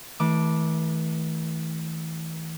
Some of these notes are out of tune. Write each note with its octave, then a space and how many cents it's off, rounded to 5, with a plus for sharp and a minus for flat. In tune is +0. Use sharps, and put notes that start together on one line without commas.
E3 -35 A3 +0 D6 +0